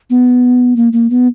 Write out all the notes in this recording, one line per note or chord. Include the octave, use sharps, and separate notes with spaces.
B3
A#3
A#3
B3